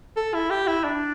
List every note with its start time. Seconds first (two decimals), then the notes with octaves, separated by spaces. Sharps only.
0.17 A4
0.34 E4
0.51 G4
0.67 E4
0.84 D4